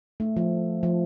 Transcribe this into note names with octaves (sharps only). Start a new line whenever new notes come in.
A3
F3
F3